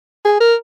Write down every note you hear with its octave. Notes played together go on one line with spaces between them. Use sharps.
G#4
A#4